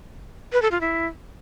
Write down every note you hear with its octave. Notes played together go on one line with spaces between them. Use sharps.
B4
A4
F4
E4